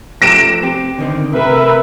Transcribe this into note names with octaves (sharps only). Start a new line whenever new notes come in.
F3 A3 G4 A#6 D7 E7
C4 G4
D3 D#3 C4
C3 A3 A#4 B4 E5